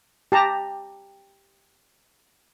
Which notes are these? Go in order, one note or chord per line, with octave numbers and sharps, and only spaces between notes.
G4 A5 A#5